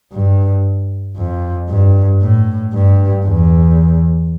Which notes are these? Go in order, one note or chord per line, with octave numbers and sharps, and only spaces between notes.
G2
F2
G2
A2
G2
E2